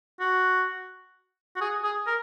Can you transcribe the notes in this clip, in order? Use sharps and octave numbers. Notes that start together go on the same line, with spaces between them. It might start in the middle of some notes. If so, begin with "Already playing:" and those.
F#4
F#4
G#4
G#4
A#4